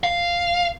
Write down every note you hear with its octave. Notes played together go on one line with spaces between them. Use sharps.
F5